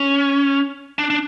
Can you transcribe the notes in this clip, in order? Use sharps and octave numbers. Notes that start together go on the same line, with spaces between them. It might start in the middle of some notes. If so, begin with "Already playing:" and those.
Already playing: C#4
D4
D4